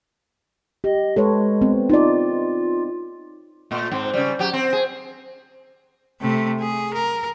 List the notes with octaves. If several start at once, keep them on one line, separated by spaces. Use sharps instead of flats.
G4 D#5
G#3 A4 B4 C#5
B3 C4
D#4 F4 D5
A#2 A3
G#2 C4
C#3 G3
F#3 G4
C4
G#4
C3 A3
G#4
A#4